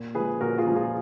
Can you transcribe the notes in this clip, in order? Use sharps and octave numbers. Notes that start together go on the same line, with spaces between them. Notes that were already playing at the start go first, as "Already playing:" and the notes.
Already playing: A#2
F3 G#3 G#4 B4
A#2 F#4 A#4
F4 G#4
F3 G#3
F4 G#4